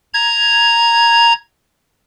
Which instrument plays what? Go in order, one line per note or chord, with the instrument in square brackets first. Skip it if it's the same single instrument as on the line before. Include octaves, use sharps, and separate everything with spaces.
[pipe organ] A#5 G#6